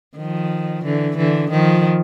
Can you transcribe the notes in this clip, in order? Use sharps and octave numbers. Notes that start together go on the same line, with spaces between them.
D#3 F3
D3 E3
D3 E3
D#3 F3